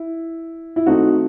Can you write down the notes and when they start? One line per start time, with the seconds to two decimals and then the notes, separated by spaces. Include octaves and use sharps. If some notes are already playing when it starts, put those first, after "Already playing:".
Already playing: E4
0.76 E4
0.86 D#3 A3 C4 D#4 F#4